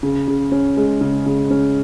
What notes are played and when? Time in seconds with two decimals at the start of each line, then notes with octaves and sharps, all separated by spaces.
0.03 C#3
0.28 C#3
0.52 C#4
0.77 G#3
1.01 C#3
1.26 C#3
1.50 C#4